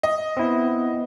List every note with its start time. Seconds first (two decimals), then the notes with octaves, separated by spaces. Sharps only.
0.03 D#5
0.37 B3 C4 E4